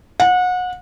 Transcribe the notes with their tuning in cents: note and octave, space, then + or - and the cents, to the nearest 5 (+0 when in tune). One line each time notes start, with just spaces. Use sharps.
F#5 -30